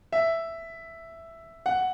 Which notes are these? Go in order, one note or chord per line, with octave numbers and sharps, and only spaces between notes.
E5
F#5